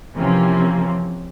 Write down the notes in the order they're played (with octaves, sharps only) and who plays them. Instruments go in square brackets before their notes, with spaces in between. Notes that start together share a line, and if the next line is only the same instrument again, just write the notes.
[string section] C3 E3 F3 A#3 C4 C#4